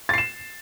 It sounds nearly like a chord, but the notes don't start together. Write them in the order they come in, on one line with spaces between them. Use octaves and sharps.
A6 C7 E7